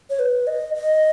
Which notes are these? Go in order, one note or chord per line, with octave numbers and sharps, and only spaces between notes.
C#5
B4
D#5
D#5